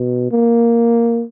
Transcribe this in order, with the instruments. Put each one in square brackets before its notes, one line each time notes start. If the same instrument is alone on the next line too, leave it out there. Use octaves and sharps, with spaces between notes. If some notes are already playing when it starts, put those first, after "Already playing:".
Already playing: [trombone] B2
A#3